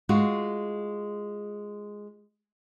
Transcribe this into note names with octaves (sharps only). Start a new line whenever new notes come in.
G#3 F4 F#4